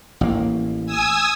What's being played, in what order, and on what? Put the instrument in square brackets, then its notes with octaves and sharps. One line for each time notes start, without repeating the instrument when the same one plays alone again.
[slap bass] A1 A#3
[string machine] G#5 D#6 E6